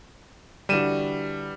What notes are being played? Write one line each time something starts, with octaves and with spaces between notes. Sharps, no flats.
D3 E3 G3 F#4 D#7 E7